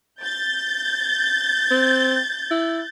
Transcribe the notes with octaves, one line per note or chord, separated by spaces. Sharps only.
G6 A6
C4
E4